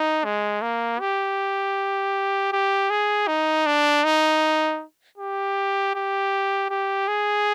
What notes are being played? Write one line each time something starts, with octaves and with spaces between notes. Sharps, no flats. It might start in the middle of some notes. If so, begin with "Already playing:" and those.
Already playing: D#4
G#3
A#3
G4
G4
G#4
D#4
D4
D#4
G4
G4
G4
G#4